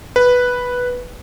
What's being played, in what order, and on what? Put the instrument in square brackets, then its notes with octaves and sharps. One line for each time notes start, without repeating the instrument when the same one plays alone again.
[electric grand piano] B4